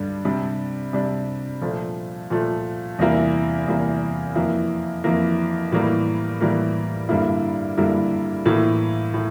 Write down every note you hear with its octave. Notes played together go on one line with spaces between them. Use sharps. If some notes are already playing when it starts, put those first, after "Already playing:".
Already playing: G2 D3 G3 D4
C3 G3 D4
C3 G3 D4
A#2 F3 A3
A#2 F3 A3
E2 C3 G3 A#3 E4
E2 C3 G3 A#3 E4
F2 E3 A#3 E4
F2 E3 A#3 E4
A2 E3 G3 A#3
A2 E3 G3 A#3
G2 D3 G3 A#3 E4
G2 D3 G3 A#3 E4
A2 E3 A#3 E4
A2